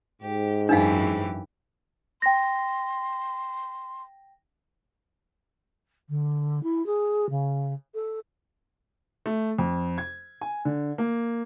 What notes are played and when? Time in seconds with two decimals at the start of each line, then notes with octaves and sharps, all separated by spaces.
0.22 G#2 G4
0.69 F#2 E3 D4 D#4 G4 F5
2.22 G5 C6 A#6
6.09 D3
6.63 E4
6.86 G#4
7.29 C#3
7.94 A4
9.26 A3
9.59 F2
9.98 G#6
10.41 G#5
10.65 D3
10.98 A#3